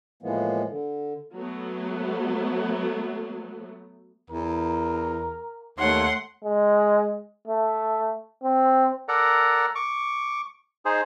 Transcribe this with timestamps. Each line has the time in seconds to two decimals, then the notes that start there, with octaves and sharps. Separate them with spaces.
0.23 A2 E3 F3 G#3 A#3 B3
0.68 D3
1.38 F#3 A3 B3
4.30 E2 A#4
5.79 D#2 A3 C#5 F#5 C6
6.44 G#3
7.47 A3
8.44 C4
9.08 A4 A#4 D5 F#5 A#5
9.75 C#6 D6
10.85 D#4 G#4 C5